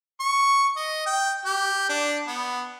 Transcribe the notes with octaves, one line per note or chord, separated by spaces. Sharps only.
C#6
D#5
G5
G4
D4
B3